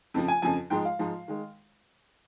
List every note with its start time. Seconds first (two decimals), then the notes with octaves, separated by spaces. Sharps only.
0.14 F2 C#3 F3
0.28 G#5
0.42 F2 C#3 F3 G#5
0.70 G#2 F3 G#3 G5
0.85 F5
0.99 G#2 F3 G#3
1.28 D#3 G#3